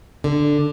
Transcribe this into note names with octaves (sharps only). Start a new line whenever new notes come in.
D3